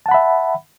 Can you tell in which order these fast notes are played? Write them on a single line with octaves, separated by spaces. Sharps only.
A5 F#5 B5 E5